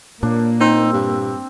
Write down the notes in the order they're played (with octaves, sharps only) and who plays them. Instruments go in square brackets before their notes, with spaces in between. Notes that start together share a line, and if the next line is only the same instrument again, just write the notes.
[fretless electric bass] A#2 [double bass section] A#3 [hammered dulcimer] D4
[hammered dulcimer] C4 [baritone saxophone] D#4
[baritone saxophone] G2